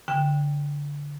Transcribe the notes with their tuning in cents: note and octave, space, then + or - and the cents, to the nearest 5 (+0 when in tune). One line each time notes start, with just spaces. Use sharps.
D3 -20 G5 +0